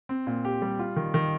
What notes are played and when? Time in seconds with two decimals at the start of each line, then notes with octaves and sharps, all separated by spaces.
0.09 C4
0.27 A#2
0.45 G4
0.62 G3
0.79 F4
0.96 D#3
1.14 D#3